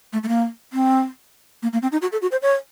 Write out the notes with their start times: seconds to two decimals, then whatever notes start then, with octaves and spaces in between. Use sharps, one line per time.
0.13 A3
0.23 A3
0.28 A#3
0.73 C4
1.63 A#3
1.73 A#3
1.82 C4
1.92 D#4
2.02 F#4
2.12 A4
2.22 F#4
2.32 C5
2.42 C#5